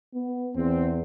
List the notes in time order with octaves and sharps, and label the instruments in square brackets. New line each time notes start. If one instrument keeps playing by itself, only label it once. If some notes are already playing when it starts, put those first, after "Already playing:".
[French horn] B3
[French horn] E2 [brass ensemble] C4